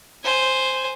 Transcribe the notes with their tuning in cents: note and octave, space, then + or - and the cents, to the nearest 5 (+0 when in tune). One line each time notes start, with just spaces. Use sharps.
C5 +0 G#5 +0